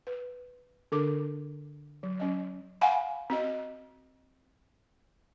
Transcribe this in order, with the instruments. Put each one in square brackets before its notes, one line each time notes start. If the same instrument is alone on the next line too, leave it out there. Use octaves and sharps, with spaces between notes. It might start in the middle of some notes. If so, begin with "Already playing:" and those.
[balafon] B4
D3 D4 A#4 D6
F#3
F#3 C#4 D#5
F5 F#5 G#5 B5
C4 F#4 D#5